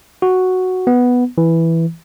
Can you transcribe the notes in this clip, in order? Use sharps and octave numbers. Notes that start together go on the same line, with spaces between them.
F#4
B3
E3